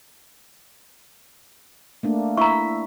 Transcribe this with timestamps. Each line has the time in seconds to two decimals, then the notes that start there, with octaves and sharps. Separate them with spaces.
2.03 A3 A#3 D4
2.37 E4 E5 A#5 C#6